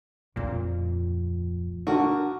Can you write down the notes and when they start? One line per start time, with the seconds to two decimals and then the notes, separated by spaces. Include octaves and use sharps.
0.36 D1 F2 A#2
1.87 D3 F#4 A#4